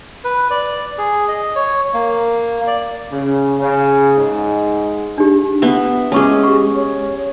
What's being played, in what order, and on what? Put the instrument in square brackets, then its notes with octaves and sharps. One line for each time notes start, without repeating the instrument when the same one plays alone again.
[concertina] B4
D5
G#4
D#5
C#5
A#3
D5
[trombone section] C#3
C#3
G#2
[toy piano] D4 D#4 G4
[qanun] B3 E5 [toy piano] F#5
[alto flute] G#3 [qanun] C#4 G#4 [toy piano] A5 C#6 D6
[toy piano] G4 C#6
[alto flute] C#5